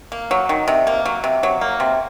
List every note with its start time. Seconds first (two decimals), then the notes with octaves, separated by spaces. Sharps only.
0.12 A#3
0.31 F#3
0.49 D#3
0.68 C3
0.87 A#3
1.05 F#3
1.24 C3
1.43 F#3
1.61 A#3
1.80 C3